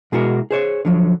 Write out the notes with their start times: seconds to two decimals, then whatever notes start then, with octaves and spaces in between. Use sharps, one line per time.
0.12 B2 G#3 E4 F#4 A#4
0.51 G#4 C5 C#5
0.85 D3 F3 F#3